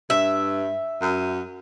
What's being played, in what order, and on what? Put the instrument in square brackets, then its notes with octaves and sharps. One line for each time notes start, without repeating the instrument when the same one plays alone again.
[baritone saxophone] G2 [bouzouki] E5
[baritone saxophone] F#2